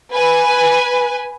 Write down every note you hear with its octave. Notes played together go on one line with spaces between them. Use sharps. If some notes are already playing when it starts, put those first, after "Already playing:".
B4 G#5